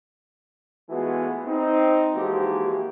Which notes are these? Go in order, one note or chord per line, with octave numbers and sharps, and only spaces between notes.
E3 G#3 A3 B3 F4 F#4
C4 D#4
E3 F3 G#3 A#3 F#4 G4